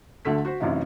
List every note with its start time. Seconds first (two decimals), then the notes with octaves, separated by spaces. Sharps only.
0.25 D2 D3 A3 B6
0.45 F#4 C5
0.60 A1 F#2 C3 E3 D#4 F5